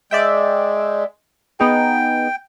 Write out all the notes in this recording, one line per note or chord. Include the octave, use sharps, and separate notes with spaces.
G#3 D5 E5 G5
B3 D#4 G#4 G5